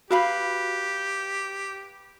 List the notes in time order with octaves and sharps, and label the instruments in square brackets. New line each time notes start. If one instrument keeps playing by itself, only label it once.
[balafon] F#4 [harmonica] G4 [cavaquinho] B4 F5 B5